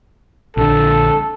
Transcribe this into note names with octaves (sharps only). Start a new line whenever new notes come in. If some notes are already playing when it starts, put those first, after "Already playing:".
A#1 D3 A4